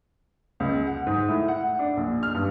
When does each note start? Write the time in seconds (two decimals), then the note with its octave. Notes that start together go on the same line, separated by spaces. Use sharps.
0.60 C#2
0.87 F#5
1.07 G#2
1.28 A2
1.48 F#5
1.79 D4
1.97 A#1
2.23 F6
2.34 G2